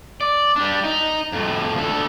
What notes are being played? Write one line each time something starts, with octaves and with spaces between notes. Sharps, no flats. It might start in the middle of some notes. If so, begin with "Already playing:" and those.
D5
G3 D4
D#4
F2 A2
D2 A4